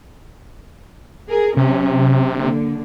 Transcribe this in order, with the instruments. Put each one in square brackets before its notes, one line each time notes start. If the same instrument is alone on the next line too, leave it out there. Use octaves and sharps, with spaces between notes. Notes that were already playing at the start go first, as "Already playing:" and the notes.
[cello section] G#4 A#4
[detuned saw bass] C3 [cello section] F#3 C#4
[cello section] D3 A#3